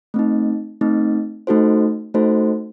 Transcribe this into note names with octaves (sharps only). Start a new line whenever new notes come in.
A3 C4 D#4
A3 C4 D#4
A3 D#4 F#4 A4 C5
A3 D#4 F#4 A4 C5